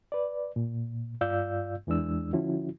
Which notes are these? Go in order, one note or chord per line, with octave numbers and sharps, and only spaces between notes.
B4 D5
A#2
G2 F4 D5 F5 E6 G6
E2 E3 G#3 D4 E6
D3 F3 C#4 E4 F#4